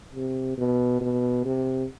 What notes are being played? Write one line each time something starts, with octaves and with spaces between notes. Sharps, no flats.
C3
B2
B2
C3